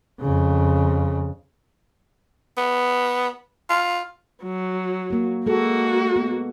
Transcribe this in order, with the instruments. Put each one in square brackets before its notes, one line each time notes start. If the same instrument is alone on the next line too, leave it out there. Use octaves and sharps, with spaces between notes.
[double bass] F2 C#3
[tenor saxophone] B3
F4
[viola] F#3
[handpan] A#3 F#4
[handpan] G#3 A4 [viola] A#3 F#4
[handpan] B3